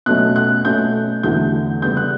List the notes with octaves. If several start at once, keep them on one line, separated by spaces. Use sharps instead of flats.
B2 F#3 A3 C#4 F#6
F#6
B2 A3 C#4 G6
E2 D3 F#3 A3 G6
C#3 G3 B3 G6
F#6